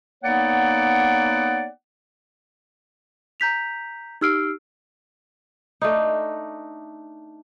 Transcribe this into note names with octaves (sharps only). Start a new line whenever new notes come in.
A#3 B3 D#4 C#5 D5 F#5
A#5 G6 B6 F7
D#4 G4 E6 F6 C7 D7
A3 D4 D#4